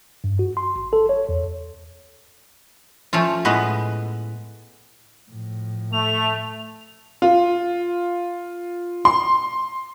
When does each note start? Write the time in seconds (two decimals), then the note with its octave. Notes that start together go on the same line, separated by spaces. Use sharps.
0.24 G2
0.39 F#4
0.57 C6
0.76 G#1
0.93 A4
1.09 C#5
1.29 E2
3.13 F3 A3 C#4 F4
3.45 A2 G#3 B3 B4
5.31 A2 F3
5.93 A3 F7
7.22 F4
9.05 C6